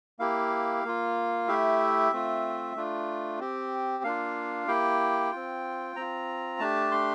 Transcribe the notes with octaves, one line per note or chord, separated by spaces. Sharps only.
A#3 E4 G4 F5
A#3 F4
A3 E4 G4 E5
A3 C4 F4
A3 D4 F4
C4 G4
A#3 D4 F4 F5
A#3 E4 G4 G5
C4 F4
C4 F4 A#5
A3 D4 G4 A5
C6